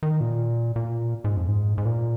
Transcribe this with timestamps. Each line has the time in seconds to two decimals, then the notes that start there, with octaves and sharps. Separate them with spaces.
0.03 D#3
0.21 A#2
0.76 A#2
1.24 G#2
1.37 F2
1.49 G#2
1.78 G#2
1.85 A#2